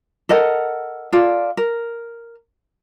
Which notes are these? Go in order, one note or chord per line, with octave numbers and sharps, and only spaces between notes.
A4 A#4 D#5 F#5
F4 A4 D5
A#4